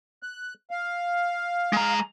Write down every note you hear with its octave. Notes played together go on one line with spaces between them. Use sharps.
F#6
F5
G#3 A#5